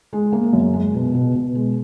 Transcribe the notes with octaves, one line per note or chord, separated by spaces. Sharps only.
G#3
A#3
F#2
G#3
B2
B2
B2
G#3